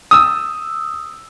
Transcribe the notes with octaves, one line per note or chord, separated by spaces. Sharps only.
D#6 E6